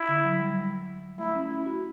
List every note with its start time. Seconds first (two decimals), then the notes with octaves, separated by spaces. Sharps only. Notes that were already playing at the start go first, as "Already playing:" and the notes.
Already playing: E4
0.09 D3
0.24 F#3
0.39 G3
0.55 G3
1.19 A3 E4
1.35 C#4
1.51 E4
1.66 F#4